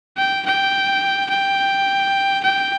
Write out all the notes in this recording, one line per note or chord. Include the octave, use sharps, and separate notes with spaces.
G5
G5
G5
G5